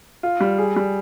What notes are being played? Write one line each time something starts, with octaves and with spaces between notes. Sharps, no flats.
F4
G3
G#4
G3